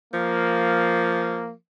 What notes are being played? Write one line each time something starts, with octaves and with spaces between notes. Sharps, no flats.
F3 A#3